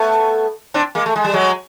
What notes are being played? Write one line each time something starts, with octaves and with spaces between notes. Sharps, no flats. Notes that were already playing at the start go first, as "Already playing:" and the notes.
Already playing: A3 B3
C4 D4
G#3 A#3
A3
G#3
G3
F#3 G#3